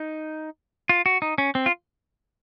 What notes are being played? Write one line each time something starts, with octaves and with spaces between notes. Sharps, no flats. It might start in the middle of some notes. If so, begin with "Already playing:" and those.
Already playing: D#4
F4
F#4
D#4
C#4
C4
F4